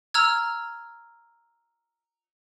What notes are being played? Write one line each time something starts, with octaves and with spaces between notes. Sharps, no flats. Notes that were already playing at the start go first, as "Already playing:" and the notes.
A#5 E6 F6 G#6